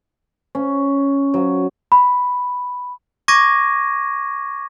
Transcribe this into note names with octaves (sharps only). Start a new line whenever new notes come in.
C#4
F#3
B5
C#6 D6 G#6 A#6 D#7